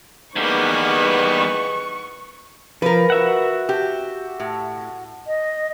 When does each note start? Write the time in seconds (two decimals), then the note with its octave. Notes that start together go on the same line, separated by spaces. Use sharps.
0.36 E2 G3 A#3 B3 D#4 G#4 B4 C#6
2.82 F3 A#4 B4
3.10 F#4 E5 F#5
3.69 G4
4.40 A2
5.27 D#5